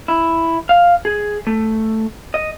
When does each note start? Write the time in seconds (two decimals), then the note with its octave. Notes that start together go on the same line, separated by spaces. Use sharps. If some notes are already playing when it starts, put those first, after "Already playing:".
0.08 E4
0.69 F5
1.05 G#4
1.47 A3
2.34 D#5